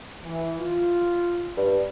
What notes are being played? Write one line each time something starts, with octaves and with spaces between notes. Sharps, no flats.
E3
F4
G2